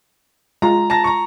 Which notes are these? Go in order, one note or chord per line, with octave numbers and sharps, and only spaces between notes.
G#3 F4 A#5
A5 A#5 A#6
A#5 C#6